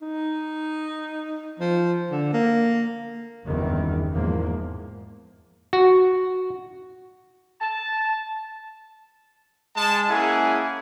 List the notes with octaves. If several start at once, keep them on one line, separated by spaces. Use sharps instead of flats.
D#4
F3
D3
A#3
F#1 E2 G2 C3 D#3
E2 G#2 F3 A#3
F#4
A5
G#3 A5
A#3 C#4 E4 G#4 F#5 G#5